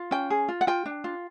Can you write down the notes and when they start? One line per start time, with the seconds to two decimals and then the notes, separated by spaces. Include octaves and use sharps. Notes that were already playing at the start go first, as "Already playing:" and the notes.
Already playing: F4
0.11 C#4 G5
0.30 G#4
0.48 F4
0.61 F#5
0.67 F4 G5
0.86 D4
1.04 F4